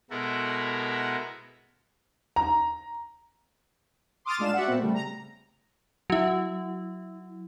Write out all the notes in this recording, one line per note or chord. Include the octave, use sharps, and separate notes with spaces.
B2 G#3 E4 F#4 A4 A#4
A#5
C6 D6 D#6 F6 A6
A#2 G#3 D4 F5 E7
F#4 D5 E5 F#5
A#2 B3 C4
C#3 G3 A3
A#5
F#3 E4